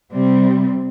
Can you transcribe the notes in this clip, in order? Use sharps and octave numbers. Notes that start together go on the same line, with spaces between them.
C3 G3 C4